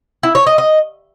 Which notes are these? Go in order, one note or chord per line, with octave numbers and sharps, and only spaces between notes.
E4
C#5
D#5
D#5